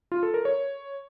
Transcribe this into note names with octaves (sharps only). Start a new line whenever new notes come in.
F4
A4
A#4
C#5